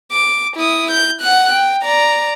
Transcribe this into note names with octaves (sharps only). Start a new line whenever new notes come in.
D6
E4 D#6
G6
F#5 F#6
G5
D5 A#5